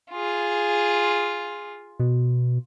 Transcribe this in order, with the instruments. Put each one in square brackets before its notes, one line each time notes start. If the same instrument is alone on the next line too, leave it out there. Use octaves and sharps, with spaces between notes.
[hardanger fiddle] F4 G#4
[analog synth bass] B2